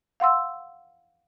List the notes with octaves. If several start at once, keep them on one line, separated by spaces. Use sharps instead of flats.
F5 F#5 C6 E6